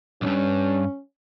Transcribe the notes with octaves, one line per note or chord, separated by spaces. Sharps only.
B1 G2 C#4